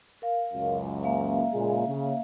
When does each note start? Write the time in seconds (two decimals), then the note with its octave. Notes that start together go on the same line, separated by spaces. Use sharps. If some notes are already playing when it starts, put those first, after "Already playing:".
0.22 A#4 F5
0.54 C#2 F#2
1.03 A#3 E5 F5
1.52 A#2 C#3 G#3
1.87 C#3